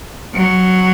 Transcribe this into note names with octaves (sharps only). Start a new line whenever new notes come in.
F#3